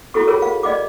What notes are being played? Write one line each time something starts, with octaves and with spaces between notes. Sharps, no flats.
E4 F#4 A4 C#6
F4 G#4 A#4 C#5
F5
D5 D#5 F5 D6